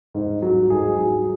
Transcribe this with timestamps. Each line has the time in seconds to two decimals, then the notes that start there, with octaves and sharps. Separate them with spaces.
0.14 G#2
0.42 F#3
0.70 G#2 G#4
0.98 F#3